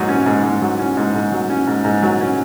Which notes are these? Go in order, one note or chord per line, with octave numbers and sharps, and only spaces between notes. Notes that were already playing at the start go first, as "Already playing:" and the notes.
Already playing: G#2 F#3
C#4
G#2
G#2
F#3
C#4
G#2
G#2
F#3
C#4
G#2
G#2
F#3
C#4